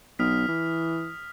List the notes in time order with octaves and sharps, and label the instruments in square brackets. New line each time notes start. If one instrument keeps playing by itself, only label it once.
[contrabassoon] B1 [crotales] D#6 F6 B6
[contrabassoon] E3